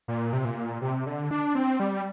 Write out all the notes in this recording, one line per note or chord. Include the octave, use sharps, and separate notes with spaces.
A#2
C3
A#2
C3
D3
D4
C4
G3